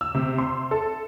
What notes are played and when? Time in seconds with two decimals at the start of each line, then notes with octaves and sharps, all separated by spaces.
0.01 E6
0.15 C3
0.38 C6
0.71 A4